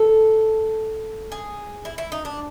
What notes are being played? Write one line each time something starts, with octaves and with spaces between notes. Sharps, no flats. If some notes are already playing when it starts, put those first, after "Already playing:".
Already playing: A4
G#4
E4
E4
D#4
D4